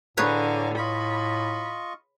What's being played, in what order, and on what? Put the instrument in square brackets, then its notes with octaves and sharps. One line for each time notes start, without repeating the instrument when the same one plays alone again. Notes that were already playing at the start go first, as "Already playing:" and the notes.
[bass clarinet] A2 [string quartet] D3 [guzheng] G#4 B4 C#5 [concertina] F5 G#5 A#5
[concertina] F4 D#5 C#6 [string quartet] B5